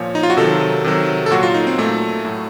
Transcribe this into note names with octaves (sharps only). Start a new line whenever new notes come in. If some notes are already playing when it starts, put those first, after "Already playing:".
Already playing: A#2 F3 C#5
D#4
F4
F#4
C3 D#3 F#3 A4
C3 D#3 F#3
A4
A#2 F#3 F#4
F4
D#4
C4
A#2 F#3 A3
A2 F#3